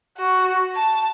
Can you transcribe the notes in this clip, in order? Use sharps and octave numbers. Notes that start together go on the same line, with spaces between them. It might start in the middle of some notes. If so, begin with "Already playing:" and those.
F#4
A5